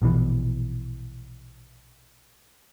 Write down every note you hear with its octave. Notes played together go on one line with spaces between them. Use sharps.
A#1 B2 D#3 E3